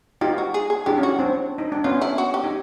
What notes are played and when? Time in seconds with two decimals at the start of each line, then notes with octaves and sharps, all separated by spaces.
0.21 D#4 F4 G4
0.38 F#4
0.54 G#4
0.70 G#4
0.86 D4 E4 G4
0.97 C#4 D#4
1.03 F#4
1.19 C4 D4
1.58 D#4
1.72 D4
1.84 B3 C#4 F4
2.01 E4
2.18 F#4
2.34 G4
2.44 D#4